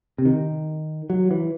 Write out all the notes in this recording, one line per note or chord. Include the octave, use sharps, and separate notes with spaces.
C3
D#3
F#3
E3